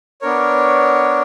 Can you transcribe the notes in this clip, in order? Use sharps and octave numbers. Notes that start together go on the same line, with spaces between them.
B3 D4 A#4 C#5